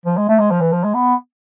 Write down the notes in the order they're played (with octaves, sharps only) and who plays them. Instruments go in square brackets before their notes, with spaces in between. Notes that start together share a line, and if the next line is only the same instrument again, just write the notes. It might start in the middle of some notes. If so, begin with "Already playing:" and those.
[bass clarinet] F3
G#3
A3
G#3
F3
E3
F3
G#3
B3